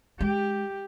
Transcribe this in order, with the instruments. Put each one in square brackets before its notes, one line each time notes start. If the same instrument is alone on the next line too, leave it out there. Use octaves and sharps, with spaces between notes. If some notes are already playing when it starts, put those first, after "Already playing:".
[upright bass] G#3 [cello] G4